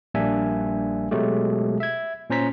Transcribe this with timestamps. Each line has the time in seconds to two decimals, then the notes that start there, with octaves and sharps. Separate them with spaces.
0.14 A#1 G3 A#3 D4 E5 G#5
1.11 B2 F#3 G#3 A3 G4
1.80 E5 G#6
2.30 A#2 C#4 C5 A#5 B6